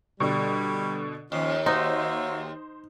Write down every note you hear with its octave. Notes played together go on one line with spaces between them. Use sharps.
B2 D3 G3
D#2 F3 C#4
A#3 D#4 F#4 C5 E5